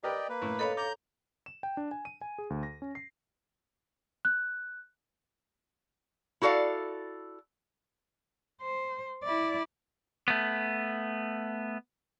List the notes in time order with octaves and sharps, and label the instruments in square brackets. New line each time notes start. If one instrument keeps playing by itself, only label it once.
[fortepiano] G4 A#4 B4 [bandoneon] D5 D#5 G5
[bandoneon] A#3 B4
[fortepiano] A2
[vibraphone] A4 C#5 F5 [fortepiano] D#5 B5
[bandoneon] A#5 G6 [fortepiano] D6
[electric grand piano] E7
G5
D4
G#5
D#7
G#5
G#4
D2
A#6
C#4
C7
[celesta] F#6
[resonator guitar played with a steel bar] E4 F#4 A4 D5 F5
[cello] C5
E4 D5
[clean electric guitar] A3 B3